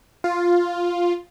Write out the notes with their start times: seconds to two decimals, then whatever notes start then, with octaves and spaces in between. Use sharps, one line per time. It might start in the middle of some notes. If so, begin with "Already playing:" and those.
0.24 F4